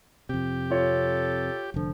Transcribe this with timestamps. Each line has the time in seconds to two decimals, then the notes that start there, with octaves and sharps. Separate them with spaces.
0.29 F2 C3 G4
0.70 F4 A4 C#5
1.74 F1 D3 F3